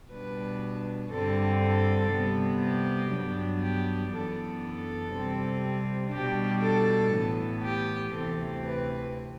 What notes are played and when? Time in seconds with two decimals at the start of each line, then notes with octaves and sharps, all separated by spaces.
0.11 B2 G3 D4 B4
1.11 G2 D3 G3 C4 A4
1.61 A4
2.11 C3 G3 B3
2.62 G4
3.12 G2 F#3 B3 D4
3.62 G4
4.12 F#2 E3 B3 D4 A4
4.63 A4
5.13 C3 G3 C4
6.13 B2 G3 D4 G4
6.62 A4
7.13 A2 E3 B3
7.63 G4
8.13 D2 C3 E3 A3 C4 A4
8.64 B4